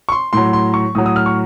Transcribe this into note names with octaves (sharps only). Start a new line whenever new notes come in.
C#6
C6
A2 F#3 C6
C6
C#6
A2 F#3 D#6
D#6
F6
C#6